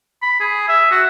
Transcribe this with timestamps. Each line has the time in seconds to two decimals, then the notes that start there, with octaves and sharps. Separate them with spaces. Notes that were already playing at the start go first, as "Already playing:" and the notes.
0.23 B5
0.41 G#4
0.69 E5
0.92 F#4